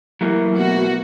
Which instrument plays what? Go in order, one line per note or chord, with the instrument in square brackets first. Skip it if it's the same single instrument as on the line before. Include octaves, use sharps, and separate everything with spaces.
[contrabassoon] E3 [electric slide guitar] F#3 A3 A#3
[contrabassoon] B2 [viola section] F#4